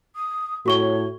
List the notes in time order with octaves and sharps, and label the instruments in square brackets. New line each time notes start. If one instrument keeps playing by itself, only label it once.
[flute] D#6
[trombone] A2 [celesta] F#4 C#6 G7 [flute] C#5